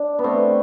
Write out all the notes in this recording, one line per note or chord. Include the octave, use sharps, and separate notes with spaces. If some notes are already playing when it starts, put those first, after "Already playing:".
Already playing: D4
B3
A3 C4